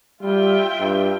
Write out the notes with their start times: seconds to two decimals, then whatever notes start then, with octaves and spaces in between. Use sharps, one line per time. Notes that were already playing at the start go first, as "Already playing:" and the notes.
0.22 G3 F4 E5 G5
0.80 G2